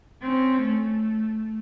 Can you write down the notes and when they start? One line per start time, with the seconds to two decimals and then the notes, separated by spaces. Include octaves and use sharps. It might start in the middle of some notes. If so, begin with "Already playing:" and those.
0.22 C4 C#4
0.62 A3